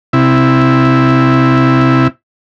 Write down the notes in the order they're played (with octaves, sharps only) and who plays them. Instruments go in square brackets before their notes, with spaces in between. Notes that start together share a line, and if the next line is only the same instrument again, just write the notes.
[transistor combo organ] C3 E4